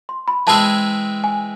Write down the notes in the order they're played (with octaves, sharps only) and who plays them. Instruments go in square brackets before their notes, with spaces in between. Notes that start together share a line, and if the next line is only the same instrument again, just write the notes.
[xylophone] C6
B5
[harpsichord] E3 G#3 C4 E4 G#4 [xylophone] A5
[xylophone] G#5